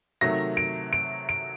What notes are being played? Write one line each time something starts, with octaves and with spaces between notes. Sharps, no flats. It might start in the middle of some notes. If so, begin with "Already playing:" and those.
C3 D#3 F#3 A3 A#6
D7
D7
D7